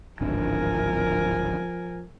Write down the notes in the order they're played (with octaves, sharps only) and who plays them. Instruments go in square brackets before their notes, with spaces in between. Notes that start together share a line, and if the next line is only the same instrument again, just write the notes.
[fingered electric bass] D1 G#1 D4 [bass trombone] F3 [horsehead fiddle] A#4 G#5